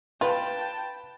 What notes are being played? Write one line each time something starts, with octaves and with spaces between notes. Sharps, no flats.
F4 B4 G5 A5